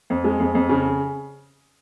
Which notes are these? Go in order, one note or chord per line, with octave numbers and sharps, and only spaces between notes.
F2
G#3
F2
F2
C#3